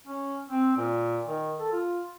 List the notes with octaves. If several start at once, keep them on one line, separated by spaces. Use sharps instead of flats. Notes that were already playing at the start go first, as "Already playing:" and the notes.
C#4
C4
A#2
D#3
A4
F4